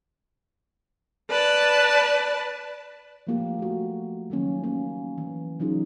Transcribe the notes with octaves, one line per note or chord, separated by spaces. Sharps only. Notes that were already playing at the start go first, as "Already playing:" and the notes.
B4 D5 A5
F3 A3 A#3 F4 G4
A3 F#4
D#3 F#3 A#3 C#4
A#3 C#4
E3
E3 F#3 C#4 D#4 F4 G#4